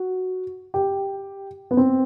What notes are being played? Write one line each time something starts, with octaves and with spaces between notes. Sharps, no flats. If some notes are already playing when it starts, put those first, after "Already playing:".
Already playing: F#4
G4
B3
C4